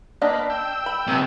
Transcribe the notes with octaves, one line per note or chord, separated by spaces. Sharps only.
A#3 D4 B4 D#5 A5
G5 E6
B5
C#2 C3